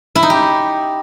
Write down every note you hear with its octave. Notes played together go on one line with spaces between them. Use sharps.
E4
D#4
G4